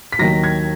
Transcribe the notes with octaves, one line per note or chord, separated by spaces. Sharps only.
B6
D#2 D#3 F#3 A#6
G#6